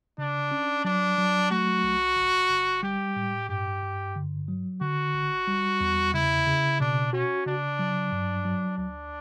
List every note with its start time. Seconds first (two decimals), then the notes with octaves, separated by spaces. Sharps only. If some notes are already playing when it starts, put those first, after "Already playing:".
0.18 C#3 D4
0.51 C#4
0.85 F#3 D4
1.18 F#3
1.51 A3 F#4
1.84 B1
2.16 G1
2.50 G1
2.83 G3 G4
3.16 A2
3.49 G2 G4
3.82 G2
4.16 D3
4.48 F#3
4.81 D3 F#4
5.14 G1
5.47 G3
5.80 E2
6.14 C#3 E4
6.47 C#3
6.80 B2 D4
7.13 C#4 F#4
7.46 C#3 D4
7.79 F#3
8.12 G2
8.45 F#3
8.78 D2 D4